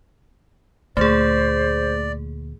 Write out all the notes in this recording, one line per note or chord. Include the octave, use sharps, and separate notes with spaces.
D2 A#2 A3 G#4 C5 D5